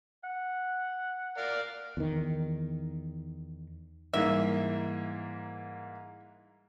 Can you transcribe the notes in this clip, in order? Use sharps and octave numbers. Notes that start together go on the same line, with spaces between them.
F#5
A#4 D5 F5
E2 D#3
G#2 E3 G3 A#3 D#4 E5